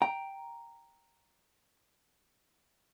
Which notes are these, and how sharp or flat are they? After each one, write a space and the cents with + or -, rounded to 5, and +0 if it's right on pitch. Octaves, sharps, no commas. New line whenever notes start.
G5 +0 A#5 +0